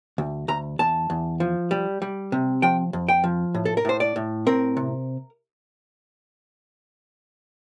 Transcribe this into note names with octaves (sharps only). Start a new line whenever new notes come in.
D2
D2 A#5
E2 A5
E2
F3
G3
G3
C3
F3 G5
F2
G5
F3
A2
A4
A#4
A2 C5
D5
A2
C4 A#4
C3